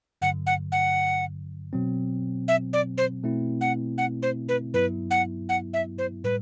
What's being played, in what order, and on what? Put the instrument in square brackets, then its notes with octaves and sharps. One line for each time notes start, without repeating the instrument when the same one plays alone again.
[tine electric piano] G2 D3 F#3 [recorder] F#5
[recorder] F#5
F#5
[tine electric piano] B2 F#3 C4
[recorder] E5
D5
C5
[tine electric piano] B2 A3 C4 E4
[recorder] F#5
F#5
C5
B4
[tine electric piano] G2 F#3 B3 E4 [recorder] B4
[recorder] F#5
F#5
E5
C5
[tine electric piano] A2 G3 [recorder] B4